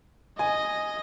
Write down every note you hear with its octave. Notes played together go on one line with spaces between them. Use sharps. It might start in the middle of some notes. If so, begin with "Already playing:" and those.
D#5 G#5